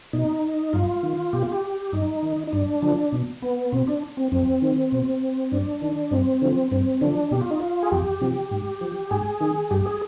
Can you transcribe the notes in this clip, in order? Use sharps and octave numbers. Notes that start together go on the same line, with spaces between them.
B2 D#4
G2 F4
D#3
B2 G4
F4
G4
G2 D#4
D#3
D#4
G2 D4
D3 F3
B2
B3
B2 C4
D4
C4
F2 C4
D#3
B2
G2 D4
D#3
G2 C4
D3 F3
G2 C4
D3 F3 D4
B2 G4
F4
D#4
F4
G#4
F2 G4
C3 F3
G#2
F3
G#2 G#4
D#3
G2 G4
G#4